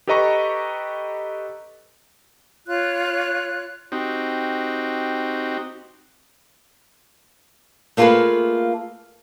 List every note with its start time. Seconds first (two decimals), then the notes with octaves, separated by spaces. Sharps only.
0.07 G4 A4 B4 D#5 A#5 C#6
2.68 F4 C#5 F#6
3.92 C4 D#4 F#4 G4
7.97 A3 A#3 F4 G#4 A4 B4